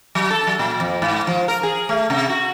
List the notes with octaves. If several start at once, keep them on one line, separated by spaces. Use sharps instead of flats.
F#3
A4
F#3
A#2
F2
G#2
F3
A#4
G#4
A3
C3
F#4